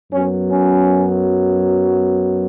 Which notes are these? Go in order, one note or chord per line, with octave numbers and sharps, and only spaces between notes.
F#2 F#3 B3 C#4
C#4